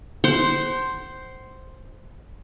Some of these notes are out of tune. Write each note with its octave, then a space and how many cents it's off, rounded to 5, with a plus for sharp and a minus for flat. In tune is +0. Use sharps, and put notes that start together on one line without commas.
C5 +0 F#5 +35